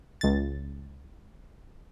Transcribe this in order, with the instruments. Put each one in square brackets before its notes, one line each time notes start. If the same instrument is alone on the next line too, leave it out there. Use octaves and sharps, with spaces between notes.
[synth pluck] C#2 A6